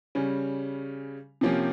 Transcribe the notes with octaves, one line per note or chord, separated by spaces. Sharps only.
C#3 G3 C#4
C3 F3 A#3 C#4 G4